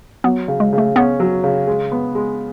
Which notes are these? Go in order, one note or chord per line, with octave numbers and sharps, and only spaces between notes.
F#3 B3
C#3
G#3
C#3
A3
B3 C#4
F#3
C#3
G#3
B3
G#3